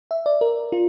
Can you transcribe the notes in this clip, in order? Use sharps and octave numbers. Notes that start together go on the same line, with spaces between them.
E5
D5
A#4
F4